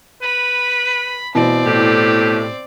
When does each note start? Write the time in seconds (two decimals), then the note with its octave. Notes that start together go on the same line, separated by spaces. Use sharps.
0.22 B4 B5
1.35 B2 E3 C4 D5
1.66 A2 G4